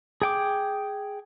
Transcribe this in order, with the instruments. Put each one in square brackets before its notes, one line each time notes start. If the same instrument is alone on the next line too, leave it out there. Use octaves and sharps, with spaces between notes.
[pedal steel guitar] G#4 G5 D6